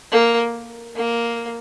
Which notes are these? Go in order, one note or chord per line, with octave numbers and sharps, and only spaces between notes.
A#3
A#3